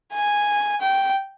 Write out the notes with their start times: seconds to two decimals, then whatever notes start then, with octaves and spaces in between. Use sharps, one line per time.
0.13 G#5
0.81 G5